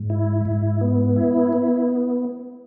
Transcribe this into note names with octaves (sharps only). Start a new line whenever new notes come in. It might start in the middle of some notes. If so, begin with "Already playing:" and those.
Already playing: G#2
E4
G#2
B3
E4
B3